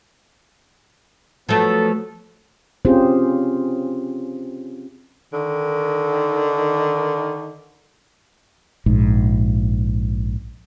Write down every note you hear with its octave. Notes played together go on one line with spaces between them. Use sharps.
F3 F#3 A3 B3 A4
C4 C#4 F4 G4 G#4 C5
D3 D#3
A#1 G#2